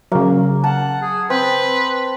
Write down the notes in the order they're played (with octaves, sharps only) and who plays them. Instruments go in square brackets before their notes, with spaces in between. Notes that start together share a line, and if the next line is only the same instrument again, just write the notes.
[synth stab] C#3 F#3 [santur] A#3
[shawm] F#5 [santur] A5
[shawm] G#4
[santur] C4 [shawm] B4